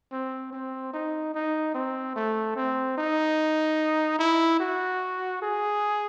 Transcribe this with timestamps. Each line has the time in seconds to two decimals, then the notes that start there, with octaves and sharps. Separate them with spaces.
0.12 C4
0.53 C4
0.93 D#4
1.34 D#4
1.75 C4
2.16 A3
2.56 C4
2.98 D#4
4.19 E4
4.60 F#4
5.42 G#4